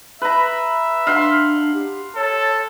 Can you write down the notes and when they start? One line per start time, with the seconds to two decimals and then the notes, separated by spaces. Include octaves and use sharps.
0.22 B4 E5 A#5
1.07 D4 F5 F#5 C6
1.74 G4
2.16 A4 C#5